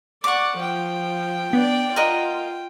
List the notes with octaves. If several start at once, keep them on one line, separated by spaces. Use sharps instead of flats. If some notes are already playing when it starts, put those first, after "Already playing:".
D5 F#5 C#6 D6
F3 G5
B3 D4 D5
F4 A#4 D#5 F#5